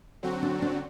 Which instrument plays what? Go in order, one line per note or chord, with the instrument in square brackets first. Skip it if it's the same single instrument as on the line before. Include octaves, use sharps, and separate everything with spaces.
[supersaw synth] D3 F#3 C4 F#4
[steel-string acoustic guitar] D4
D4